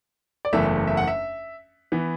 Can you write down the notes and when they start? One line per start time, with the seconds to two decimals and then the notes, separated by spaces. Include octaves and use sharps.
0.45 D5
0.53 F#1 E2 E3 A3 E5
0.87 E5
0.97 F#5
1.08 E5
1.92 E3 B3